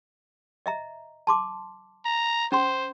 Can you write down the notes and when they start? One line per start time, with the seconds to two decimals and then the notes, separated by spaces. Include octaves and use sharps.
0.66 D#5 E5 A#5
1.27 A5 C6 D6
2.05 A#5
2.52 C#4 C5 C6